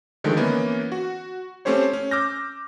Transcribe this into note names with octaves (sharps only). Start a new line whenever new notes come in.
D3 D#3 F3 G#3 A3
E3 A#3 B3 C#4
F#4
A3 C4 C#4 G4 C5 C#5
C#4
D6 E6 F6 G6 A#6